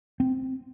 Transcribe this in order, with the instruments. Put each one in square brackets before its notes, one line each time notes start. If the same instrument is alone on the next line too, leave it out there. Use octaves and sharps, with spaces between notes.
[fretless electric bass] C4